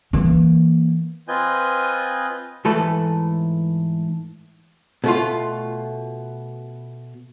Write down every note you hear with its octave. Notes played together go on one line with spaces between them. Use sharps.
E3 A#3
C4 F4 B4 D#5 G#5 G6
G#2 E3 A3 A4 B4
B2 A3 F4